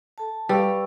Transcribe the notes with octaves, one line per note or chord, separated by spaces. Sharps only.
A4 A5
G3 B4 F5 C#6 E6